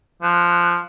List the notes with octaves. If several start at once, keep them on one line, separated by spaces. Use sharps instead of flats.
F3 F#6